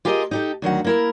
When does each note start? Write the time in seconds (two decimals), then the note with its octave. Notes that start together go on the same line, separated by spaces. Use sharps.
0.05 F4 G4 G#4 A#4 D5 D#5
0.31 D#4 G4 A4
0.62 D2 D#3 F#3 F#5
0.84 A#3 E4 A#4